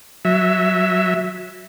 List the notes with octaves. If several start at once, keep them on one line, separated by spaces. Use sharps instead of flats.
F#3 E5